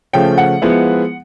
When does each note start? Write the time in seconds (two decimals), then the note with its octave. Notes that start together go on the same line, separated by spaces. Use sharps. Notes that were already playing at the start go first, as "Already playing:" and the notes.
0.13 C#3 F3 A3 C#4 G5
0.38 F#5
0.62 F3 G#3 B3 E4